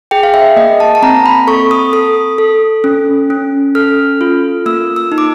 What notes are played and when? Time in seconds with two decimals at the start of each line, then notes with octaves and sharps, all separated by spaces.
0.11 G#4 G5
0.23 F5
0.34 E5
0.56 A#3 D#5
0.80 A5
0.95 A5
1.02 C4 A#5
1.26 B5
1.47 A4 C#6
1.71 D#6
1.93 A4 D#6
2.38 A4
2.84 C#4
3.30 C#4
3.75 A4 F6
4.21 F4
4.66 A#3 E6
4.96 E6
5.12 D#4
5.18 D6